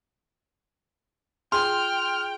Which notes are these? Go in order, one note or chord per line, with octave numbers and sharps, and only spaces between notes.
F4 G#4 G5 C6 F6